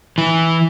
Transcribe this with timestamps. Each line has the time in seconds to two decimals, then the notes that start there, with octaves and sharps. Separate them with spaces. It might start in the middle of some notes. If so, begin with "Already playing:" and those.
0.18 E3